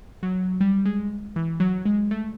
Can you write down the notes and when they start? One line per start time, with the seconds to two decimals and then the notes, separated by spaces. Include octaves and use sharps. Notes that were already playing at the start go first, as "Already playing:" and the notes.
0.23 F#3
0.61 G3
0.86 G#3
1.36 E3
1.60 F#3
1.85 G#3
2.11 A3